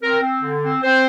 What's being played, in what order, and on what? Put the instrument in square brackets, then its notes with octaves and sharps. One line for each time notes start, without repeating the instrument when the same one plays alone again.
[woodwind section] C4 A#4
C4
D3
C4
C4 C5